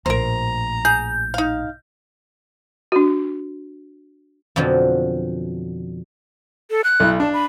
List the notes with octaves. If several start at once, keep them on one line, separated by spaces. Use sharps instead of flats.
A#1 A2 A#4 C5 A#5
G#4 G6
D#4 F5
D4 F#4
F2 B2 D3 F3 F#3
A4
F#6
B1 E4
D4 A5
B5